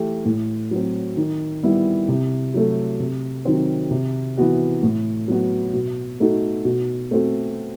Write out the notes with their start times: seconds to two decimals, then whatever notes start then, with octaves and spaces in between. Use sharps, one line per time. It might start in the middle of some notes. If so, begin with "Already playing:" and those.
Already playing: E3 A3 E4 G4
0.25 A2
0.71 F#3 C4
1.17 D#3
1.63 G3 B3 E4
2.08 C3
2.54 F#3 A3
3.00 C3
3.45 D#3 F#3 C4
3.91 C3
4.37 E3 B3 F#4
4.83 A2
5.28 F#3 B3 F#4
5.73 B2
6.20 A3 D#4 F#4
6.65 B2
7.11 A3 C4 F#4